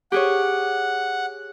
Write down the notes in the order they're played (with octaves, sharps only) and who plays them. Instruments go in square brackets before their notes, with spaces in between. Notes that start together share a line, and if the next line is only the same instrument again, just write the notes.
[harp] G4 G#4 C#5 [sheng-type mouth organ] F#5